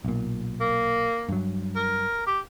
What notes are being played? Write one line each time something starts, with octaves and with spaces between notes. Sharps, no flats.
B1 A#2
A#3
G2 F#3
A#4
G4